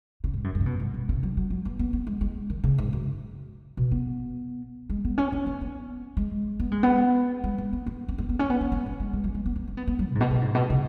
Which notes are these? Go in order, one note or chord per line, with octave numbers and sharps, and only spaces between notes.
C#3
G#2
F#2
F#2
C#3
B2
G#2
B2
C#3
F#3
F#3
F#3
B3
B3
B3
G#3
G#3
D#3
C#3
G#2
F#2
B2
B3
G#3
B3
C#4
B3
B3
B3
G#3
B3
G#3
B3
G#3
B3
B3
B3
C#4
B3
B3
C#4
B3
B3
B3
B3
G#3
G#3
F#3
G#3
B3
B3
C#4
B3
B3
F#3
B2
G#2
B2
B2
G#2
B2
C#3